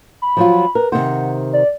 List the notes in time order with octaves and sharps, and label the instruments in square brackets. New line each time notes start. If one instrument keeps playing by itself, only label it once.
[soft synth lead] B5
[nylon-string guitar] F3 F#3 F4
[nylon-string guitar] A#4 [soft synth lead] B4
[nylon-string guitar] C3 D#3 C5 [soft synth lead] F#5
[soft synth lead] D5